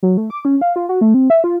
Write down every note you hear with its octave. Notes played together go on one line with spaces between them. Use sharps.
F#3
A3
D6
C#4
F5
F4
F#4
A3
C4
E5
F4